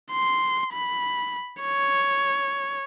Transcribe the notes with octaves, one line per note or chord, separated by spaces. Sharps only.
C6
B5
C#5